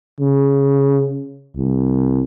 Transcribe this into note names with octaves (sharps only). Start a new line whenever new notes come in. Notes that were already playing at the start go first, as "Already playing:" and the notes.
C#3
C2